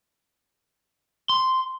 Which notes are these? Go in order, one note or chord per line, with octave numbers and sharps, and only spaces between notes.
C6